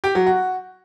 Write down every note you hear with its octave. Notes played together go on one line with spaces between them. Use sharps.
G4
F#3
F#4